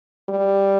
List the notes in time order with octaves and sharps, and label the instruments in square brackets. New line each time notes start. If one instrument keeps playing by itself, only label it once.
[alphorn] G3